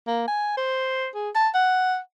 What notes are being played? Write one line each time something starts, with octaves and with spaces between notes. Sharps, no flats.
A#3
G#5
C5
G#4
A5
F#5